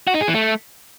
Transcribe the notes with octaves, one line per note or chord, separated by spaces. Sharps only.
F#4
D#4
G#4
E3
A3